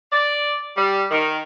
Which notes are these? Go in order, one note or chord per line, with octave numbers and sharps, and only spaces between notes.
D5
G3
D#3